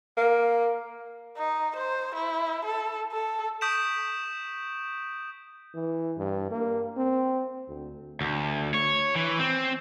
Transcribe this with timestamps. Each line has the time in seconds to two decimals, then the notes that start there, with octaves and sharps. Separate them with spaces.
0.17 A#3
1.37 D#4
1.76 C5
2.15 E4
2.65 A4
3.12 A4
3.61 C#6 D#6 G6 B6 D7 E7
5.74 E3
6.17 G2
6.51 A#3
6.97 C4
7.68 D2
8.21 D2
8.74 C#5
9.15 E3
9.39 C4